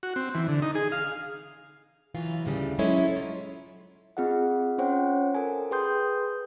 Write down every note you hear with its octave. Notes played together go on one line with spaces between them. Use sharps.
F#4
C4
E3
D3
D#4
G#4
F5
C#3 E3 F#3 F4 B4 F5
D2 A2 C#3 G3
F#3 G#3 C#4 E4 A4 C#5
F#3 F4
C4 F4 G#4 D#5 F#5
C#4 F4 C5 C#5 F#5 G5
A4 A#4 G#5
G#4 B4 G5 C6 D#6 G6